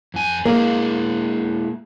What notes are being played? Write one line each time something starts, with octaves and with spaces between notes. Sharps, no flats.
F2 G#5
G#3 A#3 E4 G#4